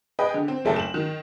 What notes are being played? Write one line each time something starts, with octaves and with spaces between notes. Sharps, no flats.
G#4 B4 D#5 G5
D3
C4
F#1 A3 G5 A5
E7 F#7
D#3